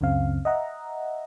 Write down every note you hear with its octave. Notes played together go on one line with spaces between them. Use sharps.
C#2 F#2 C#3 C4 F5
D#5 E5 F#5 A#5